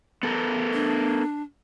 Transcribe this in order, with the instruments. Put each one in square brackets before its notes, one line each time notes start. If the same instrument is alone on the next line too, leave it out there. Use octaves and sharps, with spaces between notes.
[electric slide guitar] B3 A4 A#4
[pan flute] D4